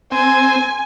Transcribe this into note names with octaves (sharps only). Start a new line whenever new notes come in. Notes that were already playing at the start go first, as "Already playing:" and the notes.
C4 G#5